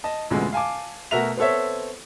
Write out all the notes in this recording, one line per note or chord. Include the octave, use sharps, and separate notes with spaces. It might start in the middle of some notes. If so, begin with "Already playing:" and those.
D#5 A5
A1 F2 B2 D3 G#3 A3
F5 G#5 A5 D6
B2 A3 F#4 A#4 E5 F7
B3 C4 A4 C#5 E5